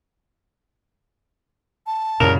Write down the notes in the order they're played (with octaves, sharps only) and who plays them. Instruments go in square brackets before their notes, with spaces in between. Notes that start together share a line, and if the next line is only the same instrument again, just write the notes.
[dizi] A5
[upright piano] C2 C#3 F7 [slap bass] F#2 A#2 [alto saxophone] A#4